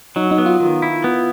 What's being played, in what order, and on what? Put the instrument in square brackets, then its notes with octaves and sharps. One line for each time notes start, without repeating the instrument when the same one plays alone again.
[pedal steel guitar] F#3 [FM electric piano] D#4
[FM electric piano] D#4
[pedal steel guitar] B3
[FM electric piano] F4
[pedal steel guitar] D#3
E4
B3